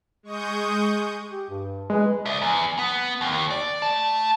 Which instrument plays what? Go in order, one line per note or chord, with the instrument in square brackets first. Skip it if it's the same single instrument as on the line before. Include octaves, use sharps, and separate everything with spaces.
[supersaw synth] G#3 C#6 D#6 G6
[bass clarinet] G4
G2
[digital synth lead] G#3 [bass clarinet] B4
[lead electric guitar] D5 E5
E2
B3
D#2
D5
A3 A5